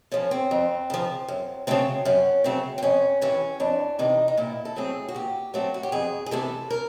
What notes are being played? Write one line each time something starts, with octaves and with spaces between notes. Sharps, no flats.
C#3 F3 C#4
C4
F2
C#3 F3
F#2
C#3 F#3 A3 C4
F#2 C#4
C#3 F#3 A3 C4
C4
F2 C#4
C3 E3 C#4
F2 D4
C3 E3 D#4
D#4
A#2 E4
A4
F#3 A3 C4 G#4
F#4
A#2 G4
F#3 A3 C4 F#4
F#4
G4
F2 G#4
G#4
C3 E3 A3 A4
A#4